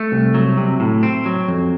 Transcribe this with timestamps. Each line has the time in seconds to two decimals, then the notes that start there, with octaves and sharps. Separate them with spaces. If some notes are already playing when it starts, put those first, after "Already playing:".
Already playing: A3
0.12 C2
0.34 F#3
0.57 C3
0.80 A2
1.03 C4
1.26 F#3
1.48 F2